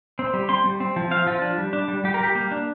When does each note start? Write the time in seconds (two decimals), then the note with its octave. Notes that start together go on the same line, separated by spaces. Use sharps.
0.19 C4
0.34 G3
0.49 C4 C6
0.65 G3
0.80 C4
0.96 F3
1.11 C4 F5
1.27 F3 F4
1.42 D4
1.58 G3
1.73 D4
1.88 G3
2.04 G3 G4
2.14 A#4
2.20 G3 G4
2.35 A#3
2.51 D4